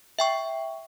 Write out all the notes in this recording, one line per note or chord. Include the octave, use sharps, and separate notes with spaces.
E5 G5 C#6